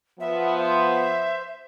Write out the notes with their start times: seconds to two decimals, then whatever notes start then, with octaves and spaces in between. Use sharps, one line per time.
0.20 F3 B3 E5
0.58 C5 E5